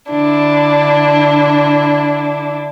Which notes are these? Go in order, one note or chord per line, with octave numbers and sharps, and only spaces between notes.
D3 D4 E4